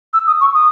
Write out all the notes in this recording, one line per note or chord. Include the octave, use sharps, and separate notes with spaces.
E6
D#6
C#6
D#6